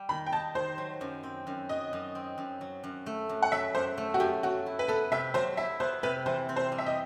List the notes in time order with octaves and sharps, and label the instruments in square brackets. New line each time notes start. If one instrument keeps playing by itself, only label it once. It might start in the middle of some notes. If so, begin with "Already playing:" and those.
Already playing: [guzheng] G3
[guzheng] D#3 [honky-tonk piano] B5
[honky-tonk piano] G5
[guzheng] D#4 [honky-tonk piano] A5
[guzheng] D#3 [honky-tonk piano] C5
[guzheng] F#3
F#2
C4
F#2
[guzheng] F#3 [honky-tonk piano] D#5
[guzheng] F#2
C4
F#2
F#3
F#2
A3
F#2
[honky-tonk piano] F#5
[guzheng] F#3 [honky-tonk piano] E5
[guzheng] F#2 [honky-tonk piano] C5
[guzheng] A3
[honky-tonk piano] F#4
[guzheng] F#2 [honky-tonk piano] G4
[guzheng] F#3 [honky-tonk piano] F#4
[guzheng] E4
[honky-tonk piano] B4
[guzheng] B3 [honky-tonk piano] A4
[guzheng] C3 [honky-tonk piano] E5
[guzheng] F#3 [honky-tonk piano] C5
[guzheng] E4 [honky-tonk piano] E5
[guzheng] B3 [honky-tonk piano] C5
[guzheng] C3 [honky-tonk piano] B4
[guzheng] E3 [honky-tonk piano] C5
[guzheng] C4
[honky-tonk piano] C5
[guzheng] G3
[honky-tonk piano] E5
D#5